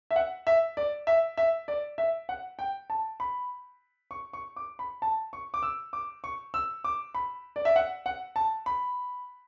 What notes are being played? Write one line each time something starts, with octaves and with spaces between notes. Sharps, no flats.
E5
F#5
E5
D5
E5
E5
D5
E5
F#5
G5
A5
B5
C#6
C#6
D6
B5
A5
C#6
D6
E6
D6
C#6
E6
D6
B5
D5
E5
F#5
F#5
A5
B5